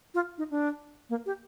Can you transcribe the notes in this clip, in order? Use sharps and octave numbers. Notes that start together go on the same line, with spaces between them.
F4
D#4
D4
A#3
G4